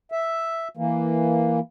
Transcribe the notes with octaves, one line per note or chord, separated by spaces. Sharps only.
E5
E3 A#3